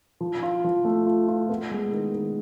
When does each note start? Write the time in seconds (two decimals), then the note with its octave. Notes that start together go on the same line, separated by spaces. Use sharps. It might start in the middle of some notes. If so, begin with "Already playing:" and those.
0.21 F3
0.43 F4
0.64 F3
0.85 A3
1.06 F4
1.28 F4
1.49 B3
1.71 G#3
1.92 D#3
2.14 D#3